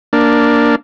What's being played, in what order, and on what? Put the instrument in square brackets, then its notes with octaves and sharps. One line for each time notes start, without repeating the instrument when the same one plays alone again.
[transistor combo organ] A#3 D4